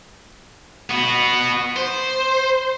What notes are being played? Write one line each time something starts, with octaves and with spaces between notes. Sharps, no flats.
B3 F#4
C5